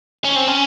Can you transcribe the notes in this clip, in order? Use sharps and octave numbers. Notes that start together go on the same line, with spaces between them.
C#4
C4
C#4